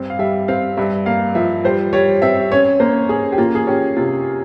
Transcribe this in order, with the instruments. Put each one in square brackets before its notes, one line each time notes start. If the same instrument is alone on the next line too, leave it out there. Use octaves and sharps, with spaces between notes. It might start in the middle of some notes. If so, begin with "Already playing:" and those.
Already playing: [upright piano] G2 C4
F5
G3 E5
C4 F5
G2 E5
A#3 F5
F3 E5
G3 C5
G3 C#5
C4 E5
C#4 C#5
A#3 C5
C#4 G#4
G4
A#3 F4
G#4
C#4 G4
C3 F4